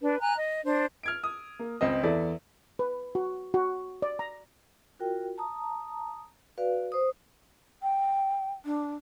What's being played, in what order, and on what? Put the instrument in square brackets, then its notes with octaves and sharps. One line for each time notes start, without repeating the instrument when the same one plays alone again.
[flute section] D4 B4
G#5 A#5 F#6
D#5
D4 C5
[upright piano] F6 G#6 D7
D#6
A#3
C#2 C4 D#5
E2 E4 A4 D5
[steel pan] B4
F#4
F#4
D5
A#5
[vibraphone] F4 F#4 A#4 G5
A5 A#5 D#6
F#4 B4 D5 F5
C5 D#6
[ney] G5
D4